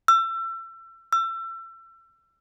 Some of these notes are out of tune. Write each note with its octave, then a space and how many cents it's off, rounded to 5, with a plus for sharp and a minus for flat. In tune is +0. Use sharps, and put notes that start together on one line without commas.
E6 +30
E6 +30